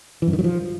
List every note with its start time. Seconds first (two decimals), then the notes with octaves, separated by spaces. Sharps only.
0.22 E3
0.28 F#2
0.33 D#3
0.39 F#3
0.44 F3